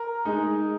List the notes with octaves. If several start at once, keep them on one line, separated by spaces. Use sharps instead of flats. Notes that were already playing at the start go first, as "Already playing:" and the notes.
Already playing: A#4
G#3 D#4